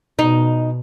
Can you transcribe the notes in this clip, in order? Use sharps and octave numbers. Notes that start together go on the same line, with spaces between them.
B2 D#4